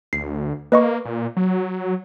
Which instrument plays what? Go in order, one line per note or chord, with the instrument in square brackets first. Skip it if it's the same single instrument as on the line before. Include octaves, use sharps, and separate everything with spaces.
[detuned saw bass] D2 [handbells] C7
[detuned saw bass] A#3 [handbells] B4 D#5 C#6
[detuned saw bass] A#2
F#3